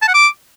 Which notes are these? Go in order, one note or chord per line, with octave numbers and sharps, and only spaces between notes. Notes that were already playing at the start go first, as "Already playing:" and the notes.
A5
F#5
D6